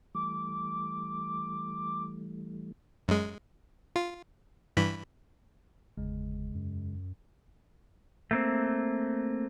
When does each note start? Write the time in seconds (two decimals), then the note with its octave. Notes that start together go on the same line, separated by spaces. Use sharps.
0.15 E3 G3 A3 D6
3.08 F#2 G#3
3.96 F4
4.77 G2 E3 B5
5.97 G1 E2 C#3 G#3
6.55 F#2
6.95 F#2
8.31 A3 A#3 C4